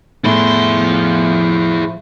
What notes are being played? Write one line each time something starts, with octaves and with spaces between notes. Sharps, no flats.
A2 F3 B3 E4 G#4 C6